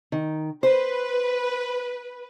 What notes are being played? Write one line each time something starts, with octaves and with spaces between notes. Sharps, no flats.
D#3
B4 C5